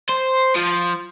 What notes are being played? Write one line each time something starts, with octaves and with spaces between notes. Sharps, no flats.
C5
F3